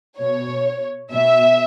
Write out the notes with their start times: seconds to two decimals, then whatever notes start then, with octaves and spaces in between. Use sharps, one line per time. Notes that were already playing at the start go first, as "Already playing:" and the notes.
0.20 B2 C#5
1.13 B2 E5